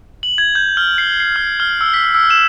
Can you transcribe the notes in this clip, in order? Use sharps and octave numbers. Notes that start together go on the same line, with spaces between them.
F#7
G#6
G6
F6
C7
C7
F6
F6
E6
B6
E6
E7